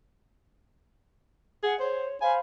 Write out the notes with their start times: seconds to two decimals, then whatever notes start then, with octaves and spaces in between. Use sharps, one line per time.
1.63 G#4 F#5
1.80 C5 C#5
2.21 C5 F5 G#5 B5